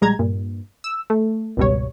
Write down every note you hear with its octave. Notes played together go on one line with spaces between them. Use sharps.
A#1 G3 G#3 A#5 G#6
G2 A#2
E6
A3
G#1 C#2 B2 G3 C#5